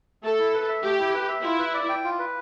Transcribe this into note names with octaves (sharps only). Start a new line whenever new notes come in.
A3 A4
E4
B4
E5
A3 G4
E4
B4
E5
E4 F4
B4
D5
G5
F4
B4